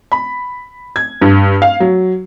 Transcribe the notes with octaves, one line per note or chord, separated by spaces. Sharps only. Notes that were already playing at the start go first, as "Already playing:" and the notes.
B5
G#6
G2
F5
F#3